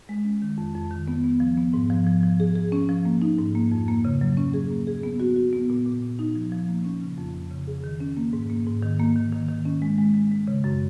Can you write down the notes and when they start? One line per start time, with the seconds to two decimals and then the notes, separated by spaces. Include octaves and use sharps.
0.09 G#3
0.25 C#4
0.42 D#3
0.58 F2
0.75 F2
0.91 D#3
1.08 B3
1.24 B3
1.40 F3
1.58 B3
1.74 G#2
1.90 F3
2.07 F3
2.23 F3
2.40 G#4
2.56 G#4
2.72 C#4
2.89 F3
3.05 A#3
3.22 D#4
3.38 G#2
3.55 A#3
3.72 F2
3.88 A#3
4.05 C#3
4.21 F#3
4.37 C#4
4.54 G#4
4.70 A#3
4.87 G#4
5.03 B3
5.20 F#4
5.36 F#4
5.53 B3
5.70 A#2
5.86 A#2
6.03 A#2
6.19 D#4
6.36 F3
6.52 F3
6.69 A#3
6.85 C#4
7.02 C#3
7.18 F2
7.34 F2
7.51 C#3
7.67 G#4
7.84 D#3
8.00 C#4
8.17 A#3
8.33 G#2
8.50 A#3
8.67 G#2
8.82 D#3
8.99 A#3
9.16 D#3
9.32 D#3
9.49 D#3
9.65 C#4
9.82 G#3
9.98 G#3
10.14 G#3
10.32 G#3
10.47 C#3
10.64 F#2